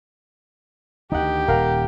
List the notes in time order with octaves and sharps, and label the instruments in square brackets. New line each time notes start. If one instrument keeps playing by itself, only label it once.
[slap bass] D2 D#3 [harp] D#4 F#5 [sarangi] G4
[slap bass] D#1 [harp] A#4 F5 F#5